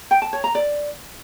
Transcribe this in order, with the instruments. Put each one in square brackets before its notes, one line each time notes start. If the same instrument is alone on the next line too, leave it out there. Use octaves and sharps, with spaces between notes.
[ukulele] G5
A5
C#5
A#5
D5